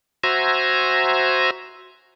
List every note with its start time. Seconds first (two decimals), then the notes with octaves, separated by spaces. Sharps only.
0.24 F#4 C5 E5 G#5 A#5